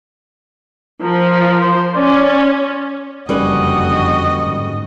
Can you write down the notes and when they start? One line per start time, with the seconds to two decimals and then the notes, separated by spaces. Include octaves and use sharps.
1.03 F3 A#4
1.61 C5
1.95 C#4 D5
3.29 F#1 F2 D3 G3 C#4 F#4 B4 D#5
4.46 G#2